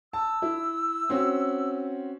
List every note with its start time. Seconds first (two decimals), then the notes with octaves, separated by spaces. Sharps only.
0.13 A5 E6
0.42 E4
1.09 C4 C#4 F#4